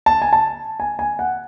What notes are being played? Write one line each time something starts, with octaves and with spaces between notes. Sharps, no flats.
A5
G#5
A5
G#5
G#5
F#5